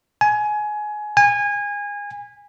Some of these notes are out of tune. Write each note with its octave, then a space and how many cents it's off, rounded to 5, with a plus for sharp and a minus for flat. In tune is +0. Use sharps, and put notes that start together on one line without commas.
G#5 +20
G#5 -25